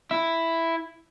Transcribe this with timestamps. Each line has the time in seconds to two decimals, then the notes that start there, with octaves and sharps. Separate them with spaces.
0.11 E4